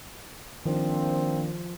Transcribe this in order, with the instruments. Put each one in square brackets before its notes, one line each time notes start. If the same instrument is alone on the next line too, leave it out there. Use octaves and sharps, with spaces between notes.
[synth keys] D#3 [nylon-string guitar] F3 [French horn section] A#3 D4 [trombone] C4